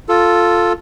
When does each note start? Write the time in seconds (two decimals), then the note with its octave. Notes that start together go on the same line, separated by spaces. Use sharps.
0.09 F4 A4